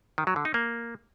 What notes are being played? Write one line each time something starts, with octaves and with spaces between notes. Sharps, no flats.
D#3
F#3
D3
D#4
A#3